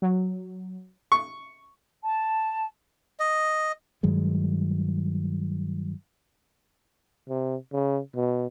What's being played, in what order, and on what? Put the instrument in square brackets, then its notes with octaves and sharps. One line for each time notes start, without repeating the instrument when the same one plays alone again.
[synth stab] F#3
[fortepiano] C#6
[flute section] A5
[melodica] D#5
[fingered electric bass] G2 D#3 F#3 G#3
[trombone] C3
C#3
B2